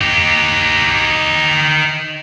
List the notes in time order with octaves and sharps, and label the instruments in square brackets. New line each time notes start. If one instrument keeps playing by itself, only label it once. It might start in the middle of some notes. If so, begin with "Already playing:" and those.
[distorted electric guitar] D#4 G4